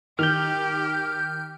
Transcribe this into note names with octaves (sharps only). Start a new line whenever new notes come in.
D#3 G4 F6 G6